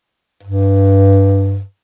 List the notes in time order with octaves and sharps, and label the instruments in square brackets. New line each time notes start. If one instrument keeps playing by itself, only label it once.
[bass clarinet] G2